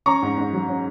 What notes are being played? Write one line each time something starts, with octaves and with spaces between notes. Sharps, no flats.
C#4 A#5 C#6
G#2
G#2
F#3
C#4